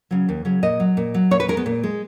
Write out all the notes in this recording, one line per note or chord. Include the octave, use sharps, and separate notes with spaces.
C#3 F#3
D#2
C#3 F#3
A#2 D#5
F#3
A#2
F#3
A#2 C#5
B4
G#3 A#4
B3
A#2
G#3